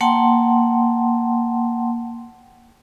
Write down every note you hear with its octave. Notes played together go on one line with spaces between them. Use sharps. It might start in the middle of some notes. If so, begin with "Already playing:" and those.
A#3 F#5 G5 A5 C6